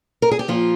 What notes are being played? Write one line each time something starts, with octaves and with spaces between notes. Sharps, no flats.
A#4
G#4
G4
A#2 F3 F4